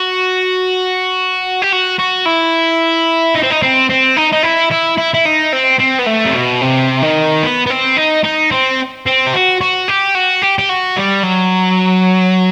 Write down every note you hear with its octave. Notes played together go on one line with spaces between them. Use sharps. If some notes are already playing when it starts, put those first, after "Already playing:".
Already playing: F#4
G4
F#4
F#4
E4
D#4
C4
D#4
C4
C4
D#4
D#4
E4
E4
E4
E4
D#4
C4
C4
B3
A3
C3
B2
C3
D#3
B3
B3
C4
D#4
D#4
C4
C4
G4
F#4
F#4
G4
F#4
G4
G4
F#4
G3
F#3